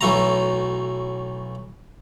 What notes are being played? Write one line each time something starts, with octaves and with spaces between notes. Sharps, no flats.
B1 E3 F#3 A3 A5 A#5